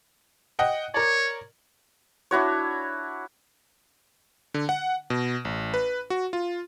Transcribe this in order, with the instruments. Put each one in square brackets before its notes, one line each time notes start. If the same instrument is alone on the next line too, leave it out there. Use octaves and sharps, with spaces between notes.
[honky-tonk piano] D#5 F#5 G5
[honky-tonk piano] A#4 D5 [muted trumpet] C#5
[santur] D4 E4 F#4 C#5
[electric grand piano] D3
F#5
B2
A1
B4
F#4
F4